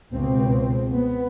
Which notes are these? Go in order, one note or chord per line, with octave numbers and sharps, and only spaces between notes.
C#2 B2 C4
B3